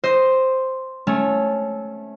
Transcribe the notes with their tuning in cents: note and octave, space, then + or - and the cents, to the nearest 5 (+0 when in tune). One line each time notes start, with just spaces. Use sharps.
C5 +0 D#5 +0
A3 -15 C#4 +0